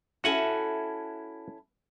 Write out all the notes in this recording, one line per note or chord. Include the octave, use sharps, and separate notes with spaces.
C#4 E4 F#4 A4 F#5 G#5